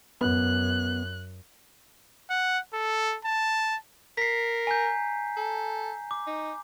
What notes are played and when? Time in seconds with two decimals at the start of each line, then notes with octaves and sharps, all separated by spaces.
0.21 F#2 B3 F#6
2.30 F#5
2.73 A4
3.25 A5
4.17 A#4 B6 C7
4.67 G#5 A#5 G6
5.37 A4
6.11 D6
6.27 D#4